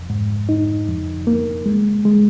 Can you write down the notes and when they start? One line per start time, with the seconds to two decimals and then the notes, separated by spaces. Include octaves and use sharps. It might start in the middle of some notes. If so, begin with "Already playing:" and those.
Already playing: F2
0.10 G#2
0.49 D#4
0.88 F2
1.27 A#3
1.66 G#3
2.05 G#3